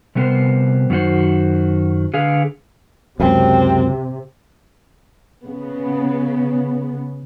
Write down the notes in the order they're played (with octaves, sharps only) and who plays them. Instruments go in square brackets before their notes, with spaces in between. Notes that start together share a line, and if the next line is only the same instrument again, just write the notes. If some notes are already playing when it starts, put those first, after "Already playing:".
[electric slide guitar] C3 G3 A3 B3 A#4 C5
F#2 D#3 F#4 C5
D3 G#4 B4 F5
[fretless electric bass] C#2 F#2 [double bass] C3 [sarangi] C4
[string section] C#3 B3